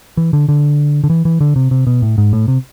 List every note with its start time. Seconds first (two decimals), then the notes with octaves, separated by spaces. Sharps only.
0.17 E3
0.33 D3
0.49 D3
1.04 D3
1.10 E3
1.25 E3
1.41 D3
1.56 C3
1.71 C3
1.87 B2
2.02 A2
2.18 G#2
2.33 A2
2.48 C3